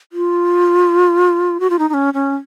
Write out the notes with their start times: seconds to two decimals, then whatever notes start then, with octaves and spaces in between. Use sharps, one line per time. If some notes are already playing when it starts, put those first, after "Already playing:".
0.13 F4
1.60 F#4
1.70 F4
1.79 D#4
1.89 D#4
1.94 C#4
2.14 C#4